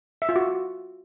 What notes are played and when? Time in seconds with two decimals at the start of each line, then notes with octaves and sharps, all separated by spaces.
0.22 E5
0.29 F4
0.36 F#4